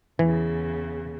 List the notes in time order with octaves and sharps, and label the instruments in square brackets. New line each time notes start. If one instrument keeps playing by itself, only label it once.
[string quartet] E2 C#3 [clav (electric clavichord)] E3